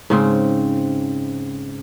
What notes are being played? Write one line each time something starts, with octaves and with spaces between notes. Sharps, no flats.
G#2 C#3 C4